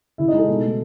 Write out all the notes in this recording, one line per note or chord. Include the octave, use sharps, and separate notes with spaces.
C#3 E4 E5
D#4 D#5
G#3
A4
B2
A3